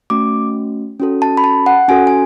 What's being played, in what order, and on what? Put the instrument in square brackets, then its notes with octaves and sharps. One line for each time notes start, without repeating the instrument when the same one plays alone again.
[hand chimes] A3 C#4 F#4 D6
C#4 F#4 A4
A5
B5
A5
F#5
C#4 F#4 A4 G#5
G#5